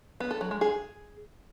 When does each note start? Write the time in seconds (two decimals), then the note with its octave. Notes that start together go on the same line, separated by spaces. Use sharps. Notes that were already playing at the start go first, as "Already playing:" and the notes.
0.20 B3
0.31 A4
0.41 F#3
0.51 G#3
0.61 G#4